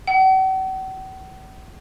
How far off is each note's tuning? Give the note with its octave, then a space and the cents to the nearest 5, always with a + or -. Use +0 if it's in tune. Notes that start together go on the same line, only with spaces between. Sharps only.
F#5 +45